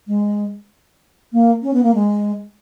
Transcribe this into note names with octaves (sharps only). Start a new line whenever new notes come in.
G#3
A#3
C#4
B3
A#3
G#3